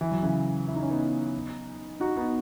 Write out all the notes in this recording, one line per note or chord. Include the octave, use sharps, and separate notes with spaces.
E3
F#3
C#3 E3
E4
D#4
C#4
B3 D#4
D#4 F#4
B3 D#4